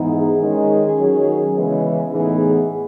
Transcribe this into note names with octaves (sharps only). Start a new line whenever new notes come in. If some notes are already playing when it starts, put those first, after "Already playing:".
Already playing: G#2 E3 B3 D#4
G#4
D#3 G#3 C#4
D#3 F#3 C#4
C#3 E3 G#3 B3
A2 E3 B3 D#4 G#4
G#4